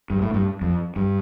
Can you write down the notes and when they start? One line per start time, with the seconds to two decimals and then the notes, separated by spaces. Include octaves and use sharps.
0.10 G2
0.22 A2
0.34 G2
0.62 F2
0.96 G2